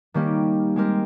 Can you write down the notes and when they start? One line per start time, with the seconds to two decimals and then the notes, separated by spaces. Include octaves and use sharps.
0.14 D#3 G3 A#3 C#4 G4
0.76 G#3 C4 G4 A#4